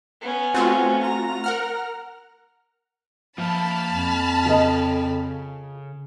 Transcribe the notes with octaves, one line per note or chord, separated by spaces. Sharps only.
B3 C#4
A3 C4 F4 F#4
A#5
A#4 F#5 F6
F3 A#3 E5 F5 A5 B5 F6
F2
C#3 F4 A4 D#5